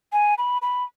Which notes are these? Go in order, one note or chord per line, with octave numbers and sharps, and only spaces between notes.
G#5
B5
B5